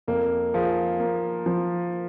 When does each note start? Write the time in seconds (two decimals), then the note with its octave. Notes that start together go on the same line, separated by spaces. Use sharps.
0.08 F2 A#3
0.54 F3 G#4
0.99 A#3
1.46 F3